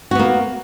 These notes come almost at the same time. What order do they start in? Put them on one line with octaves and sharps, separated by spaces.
F#4 B3 A#3